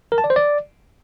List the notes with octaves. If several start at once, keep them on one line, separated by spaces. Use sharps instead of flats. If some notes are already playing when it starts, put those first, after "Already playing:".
A#4
A5
D5
C5
D5